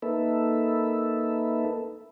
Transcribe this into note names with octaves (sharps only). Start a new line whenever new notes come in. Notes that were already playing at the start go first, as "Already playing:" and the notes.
A#3 D#4 A4 B4 E5